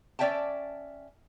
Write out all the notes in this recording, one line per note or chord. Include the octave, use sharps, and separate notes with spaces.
C#4 D5 E5 G5 A5